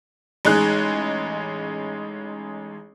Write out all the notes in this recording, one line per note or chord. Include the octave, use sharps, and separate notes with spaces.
A1 G#3 D#4 G#4 F#6